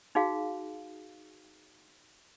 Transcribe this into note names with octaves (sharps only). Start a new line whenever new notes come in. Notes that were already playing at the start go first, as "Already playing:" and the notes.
D#4 F#4 G#4 F5